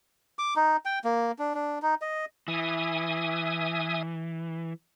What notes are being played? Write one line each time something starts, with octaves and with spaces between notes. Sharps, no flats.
D6
D#4
G5
A#3
D4
D4
D#4
D#5
E3 E5 G#5 D#6